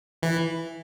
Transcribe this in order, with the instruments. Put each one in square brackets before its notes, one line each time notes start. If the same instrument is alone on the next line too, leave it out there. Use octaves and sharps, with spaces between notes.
[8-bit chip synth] E3